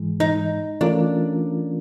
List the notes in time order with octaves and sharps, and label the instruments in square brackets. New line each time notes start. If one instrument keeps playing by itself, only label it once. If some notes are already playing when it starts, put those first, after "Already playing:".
Already playing: [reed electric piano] G#2 E3 G#3
[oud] D#4
[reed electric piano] E3 A3 C#4 F4 A#4 [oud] D4